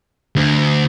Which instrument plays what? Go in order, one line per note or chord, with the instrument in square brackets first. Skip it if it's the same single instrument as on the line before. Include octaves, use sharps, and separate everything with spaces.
[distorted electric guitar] D2